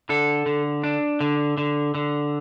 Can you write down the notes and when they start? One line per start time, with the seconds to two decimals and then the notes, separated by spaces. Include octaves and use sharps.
0.09 D3 A4
0.46 D3
0.84 D4
1.21 D3
1.58 D3
1.95 D3